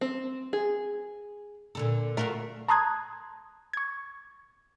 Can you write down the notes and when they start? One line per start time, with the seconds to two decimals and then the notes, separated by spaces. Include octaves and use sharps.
0.01 C4
0.53 G#4
1.75 A#2 D3 A4
2.17 A3 F4 F#4 A#4
2.68 A5 A#5 C6 D#6 F#6 G#6
3.73 C#6 G#6